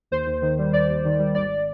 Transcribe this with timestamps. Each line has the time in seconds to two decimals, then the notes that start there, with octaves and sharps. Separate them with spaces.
0.11 D#2 C5
0.27 D#2
0.42 D#3
0.59 G3
0.73 D#2 D5
0.89 D#2
1.05 D#3
1.19 G3
1.35 G#1 D5